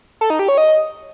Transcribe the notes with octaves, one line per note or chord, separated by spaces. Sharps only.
A4
D#4
G4
C#5
D#5